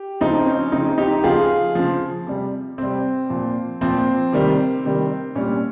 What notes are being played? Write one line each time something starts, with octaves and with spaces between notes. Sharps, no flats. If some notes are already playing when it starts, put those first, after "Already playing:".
Already playing: G4
C#3 F3 C4 D#4
C#4
C#3 F3 C4 D#4
D#4 G4
G4
C#3 F3 F4 G#4
C#3 F3
C3 G3
C3 G3 C4
A#2 F3
A#2 F3 C4
C3 D#3 G3
C3 D#3 G3
A#2 G3 C#4